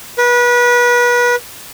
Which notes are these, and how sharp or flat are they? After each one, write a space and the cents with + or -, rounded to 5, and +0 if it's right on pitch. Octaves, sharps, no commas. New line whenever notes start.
B4 -30